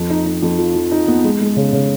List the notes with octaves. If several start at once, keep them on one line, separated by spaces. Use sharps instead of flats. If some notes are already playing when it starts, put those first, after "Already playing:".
Already playing: F2
D#4
D#4
F2
F3
F3
D#4
B3
G#3
G#3
C#3
C#3